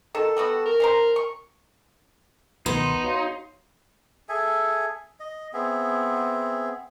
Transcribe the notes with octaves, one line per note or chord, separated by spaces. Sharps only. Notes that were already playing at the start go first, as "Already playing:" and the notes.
D#3 A4
G3 B3 F#4
A#4
C#4 C5 A#5
C#6
C#2 B2 D#3 B3 D#4 C6
F#4 C#5 F5
G#4 A4 E5 G#5
D#5
B3 C4 G#4 E5